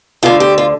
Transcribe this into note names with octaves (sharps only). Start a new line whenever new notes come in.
D2 D3 F4
G4
F4